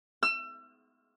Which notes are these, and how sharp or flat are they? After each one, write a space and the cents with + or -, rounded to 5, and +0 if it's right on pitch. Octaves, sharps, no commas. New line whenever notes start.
E6 +35